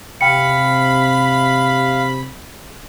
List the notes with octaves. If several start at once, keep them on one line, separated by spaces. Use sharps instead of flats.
C3 F5 G5 B5 C#7